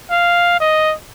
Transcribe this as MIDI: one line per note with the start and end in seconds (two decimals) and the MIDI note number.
0.11 0.59 77
0.60 0.94 75